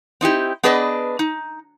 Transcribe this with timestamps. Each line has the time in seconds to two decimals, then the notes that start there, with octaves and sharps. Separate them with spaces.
0.21 C4 D#4 E4 G4
0.63 B3 D4 G#4 B4 D5 D#5
1.19 D#4